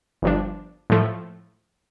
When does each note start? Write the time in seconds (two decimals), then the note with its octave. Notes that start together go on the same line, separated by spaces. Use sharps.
0.22 G1 G2 F3 D4
0.90 A2 F3 A3